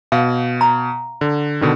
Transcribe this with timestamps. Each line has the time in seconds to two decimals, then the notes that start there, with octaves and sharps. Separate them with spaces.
0.12 B2 F5
0.61 A#5
1.21 D3
1.61 B2 D3 D#3